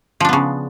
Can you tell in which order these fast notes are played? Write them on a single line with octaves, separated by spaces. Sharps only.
F3 D4 B3 C#3